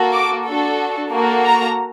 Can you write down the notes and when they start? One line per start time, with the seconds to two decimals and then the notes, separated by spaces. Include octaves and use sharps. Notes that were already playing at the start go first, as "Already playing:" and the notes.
Already playing: A#3 F#4 A4
0.13 D6
0.47 D4 F#4 A4
1.12 A#3 F#4 A4
1.45 A#5